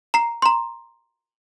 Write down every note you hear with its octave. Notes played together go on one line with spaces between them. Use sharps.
A#5 C7
A#5 C6